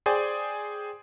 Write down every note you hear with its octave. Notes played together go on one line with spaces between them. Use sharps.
G#4 C5 D5 G5 G#5